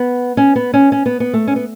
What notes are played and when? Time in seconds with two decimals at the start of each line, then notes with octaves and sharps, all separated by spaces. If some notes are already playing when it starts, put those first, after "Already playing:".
Already playing: B3
0.37 C#4
0.56 B3
0.74 C#4
0.92 C#4
1.06 B3
1.20 B3
1.33 A3
1.47 C#4
1.56 B3